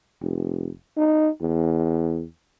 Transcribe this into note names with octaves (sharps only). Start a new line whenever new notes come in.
F1
D#4
E2